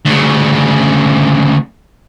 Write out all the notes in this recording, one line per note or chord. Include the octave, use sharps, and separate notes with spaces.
D2 C#3